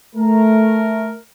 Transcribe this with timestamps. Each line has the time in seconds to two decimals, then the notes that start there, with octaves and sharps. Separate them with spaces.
0.15 A3 A#4